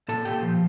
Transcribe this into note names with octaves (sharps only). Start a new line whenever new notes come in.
A#2 A4 A5
A#2 G4 G5
F3